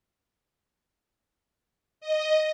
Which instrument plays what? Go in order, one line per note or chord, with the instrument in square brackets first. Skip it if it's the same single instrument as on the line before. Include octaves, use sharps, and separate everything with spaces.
[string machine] D#5